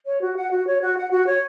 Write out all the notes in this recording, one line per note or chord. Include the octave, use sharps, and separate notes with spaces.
C#5
F#4
F#5
F#4
C#5
F#4
F#5
F#4
C#5